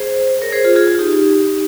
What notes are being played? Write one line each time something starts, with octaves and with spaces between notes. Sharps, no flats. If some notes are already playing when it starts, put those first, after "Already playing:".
Already playing: G#4 C5
A#4 C#5
G#4 C5
F4 G#4
F4 G#4
F4
D#4 G4